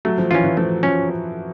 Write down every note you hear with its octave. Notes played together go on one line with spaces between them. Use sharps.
F#3 A3
F3
E3 C#4 F4
E3
F3 A3
F3 C#4